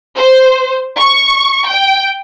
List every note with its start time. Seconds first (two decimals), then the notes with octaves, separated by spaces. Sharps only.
0.17 C5
0.98 C#6
1.67 G5